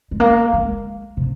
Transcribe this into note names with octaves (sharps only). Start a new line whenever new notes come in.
G#3
A#3
G#3
C3